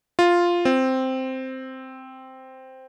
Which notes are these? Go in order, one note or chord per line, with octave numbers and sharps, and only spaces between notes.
F4
C4